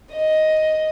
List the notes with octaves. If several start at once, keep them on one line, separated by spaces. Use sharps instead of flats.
D#5